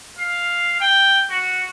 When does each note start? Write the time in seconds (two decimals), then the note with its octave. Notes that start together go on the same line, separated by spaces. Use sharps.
0.19 F5
0.80 G5
1.30 F#4